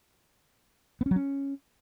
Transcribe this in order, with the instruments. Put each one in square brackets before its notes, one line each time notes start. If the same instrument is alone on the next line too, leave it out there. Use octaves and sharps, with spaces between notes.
[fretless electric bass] B3
C#4
F#3
C#4